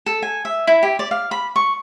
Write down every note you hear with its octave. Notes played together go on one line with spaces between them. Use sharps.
A4
G#5
E5
E4
G4
D5
F5
B5
C#6